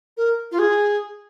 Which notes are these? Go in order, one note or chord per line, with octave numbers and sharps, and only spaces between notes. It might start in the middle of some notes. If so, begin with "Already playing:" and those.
A#4
F4
G#4